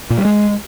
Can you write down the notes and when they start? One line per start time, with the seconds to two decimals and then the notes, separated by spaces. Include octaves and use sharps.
0.10 A#2
0.18 G3
0.25 G#3